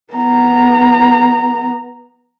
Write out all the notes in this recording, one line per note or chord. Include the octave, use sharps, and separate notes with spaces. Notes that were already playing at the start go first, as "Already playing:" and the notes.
B3 A#5